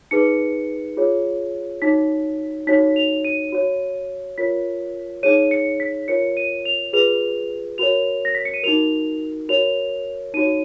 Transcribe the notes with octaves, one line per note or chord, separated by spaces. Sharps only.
D#4 G#4 B4 C#7
F4 G#4 C#5
D#4 F#4 C#5 B6
D#4 F#4 C#5 B6
F7
D#7
F#4 C#5
F4 A#4 C#5 B6
D#4 G#4 C#5 D#7
C#7
B6
F4 A#4 C#5 C#7
D#7
F7
F4 G#4 B4 F7
F#4 A#4 C#5 F7
A#6
B6
C#7
D#7
D#4 F#4 A#4 F7
F#4 A#4 C#5 F7
D#4 F#4 C#5 D#7